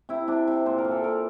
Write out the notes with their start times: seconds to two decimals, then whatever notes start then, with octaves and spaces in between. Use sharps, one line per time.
0.09 C3 E4
0.28 C3 D4
0.48 C3
0.66 A#2 C5
0.78 A#4
0.84 A#2
0.91 A4
1.04 A#2 A#4